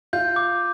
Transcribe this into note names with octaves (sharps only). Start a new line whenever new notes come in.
F4 G6
D6